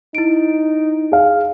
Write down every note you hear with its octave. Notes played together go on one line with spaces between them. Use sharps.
D#4 E4 D7
G#4 F5